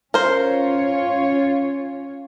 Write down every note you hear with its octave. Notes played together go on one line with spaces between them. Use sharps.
C#4 F4 A#4 C5 C#5